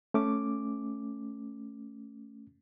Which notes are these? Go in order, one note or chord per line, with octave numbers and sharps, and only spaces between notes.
A3 C#4 D6